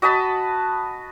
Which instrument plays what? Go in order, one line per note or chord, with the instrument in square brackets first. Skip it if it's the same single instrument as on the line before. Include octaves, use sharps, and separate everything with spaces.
[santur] F#4 D#5 A5 B5